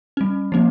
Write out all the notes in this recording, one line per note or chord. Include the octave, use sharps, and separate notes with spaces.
G3 C#4
F3 A#3 C#4